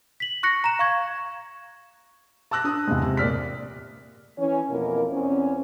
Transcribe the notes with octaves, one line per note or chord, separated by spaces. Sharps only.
B6 F#7
C#6 F#6 A#6 C#7
A#5 E7
F5 C#6 G#6
A5 D6 E6 F#6 A#6
D4 D#6
E2 C3 G#3
C3
A#2 D5 F6 B6
E3 C#4
F2 B2 A#3 E4 A#4
E2 C4 C#4